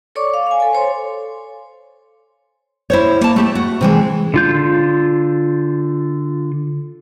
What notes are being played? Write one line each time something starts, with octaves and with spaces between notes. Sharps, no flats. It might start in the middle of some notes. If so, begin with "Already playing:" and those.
A4 C#5 D5 C#6 D6
F5 D6
F5 G#5
A4 G#5
C5 C#5 C6
E4 C5 C#5
A#3 A5
A3 G4 E5
F#4
C3 E3 G#3
D3 F4 G6